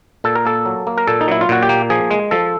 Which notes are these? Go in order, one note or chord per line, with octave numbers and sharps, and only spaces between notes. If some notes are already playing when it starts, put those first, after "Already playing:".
A#2 A4
A#4
A#3 A4
F#3
A#3
A#4
A#2 A4
D#4
F#3 E4
F4
A#2 F#4
G4
A#3
F3 G#4
G#3
F3 A4